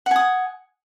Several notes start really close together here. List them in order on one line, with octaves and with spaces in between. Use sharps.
F#5 G#5 D#6